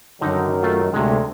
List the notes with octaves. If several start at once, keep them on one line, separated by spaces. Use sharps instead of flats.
F#2 D3 D#3 F#3 D#4
A3 F4
D2 C3 G#3 A3